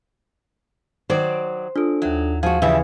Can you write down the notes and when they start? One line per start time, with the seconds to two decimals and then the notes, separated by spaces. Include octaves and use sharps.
1.10 D#3 F#3 C5 D5
1.76 D4 F4 A4
2.02 D#2 F#3 E5
2.43 F3 F#4 G#4 F5
2.62 C#3 E3 F3 G3 E5